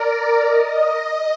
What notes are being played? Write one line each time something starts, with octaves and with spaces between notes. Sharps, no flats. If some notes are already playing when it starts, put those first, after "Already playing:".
Already playing: A#4 D5
D#5